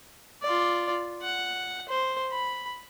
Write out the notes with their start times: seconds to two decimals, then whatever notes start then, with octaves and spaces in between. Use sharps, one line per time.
0.42 F4 D5
1.22 F#5
1.89 C5
2.31 B5